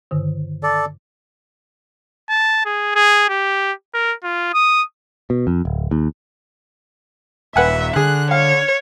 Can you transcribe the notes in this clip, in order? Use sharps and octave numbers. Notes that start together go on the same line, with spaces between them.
G2 D3 D#3
A4 D5
A5
G#4
G#4
G4
A#4
F4
D#6
B2
F2
D1
D#2
D#1 B4 E5 F#5 G#5
D3 G#4 F#6
C#5 F5